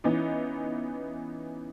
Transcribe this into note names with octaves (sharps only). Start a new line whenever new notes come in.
E3 B3 C#4 D#4 E4